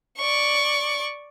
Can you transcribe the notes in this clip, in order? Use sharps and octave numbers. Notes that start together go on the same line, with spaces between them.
D5 C#6